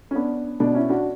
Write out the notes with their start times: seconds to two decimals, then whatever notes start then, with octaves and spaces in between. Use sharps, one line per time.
0.11 C#4
0.15 B3 D4
0.60 B2 B3 D4
0.75 C#4 E4
0.89 D4 F#4